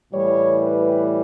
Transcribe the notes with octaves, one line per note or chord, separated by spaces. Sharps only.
A2 E3 G3 C#5
B4